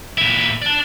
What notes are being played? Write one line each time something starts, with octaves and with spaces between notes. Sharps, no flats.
A#2 E4
D5 A5